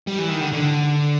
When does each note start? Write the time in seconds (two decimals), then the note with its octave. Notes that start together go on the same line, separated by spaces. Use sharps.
0.07 G3
0.18 E3
0.29 D#3
0.40 D3
0.52 D3